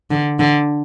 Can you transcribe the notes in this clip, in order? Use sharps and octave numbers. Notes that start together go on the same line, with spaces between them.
D3
D3